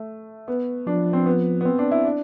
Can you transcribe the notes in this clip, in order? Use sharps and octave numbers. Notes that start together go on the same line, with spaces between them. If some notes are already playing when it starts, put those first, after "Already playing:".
Already playing: A3
B3
F3 D4
C4
B3
B3
C4
D4
E4
D4